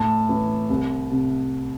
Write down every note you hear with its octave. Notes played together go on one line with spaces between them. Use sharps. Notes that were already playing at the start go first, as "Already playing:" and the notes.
Already playing: A2 A5
E3
C2
C3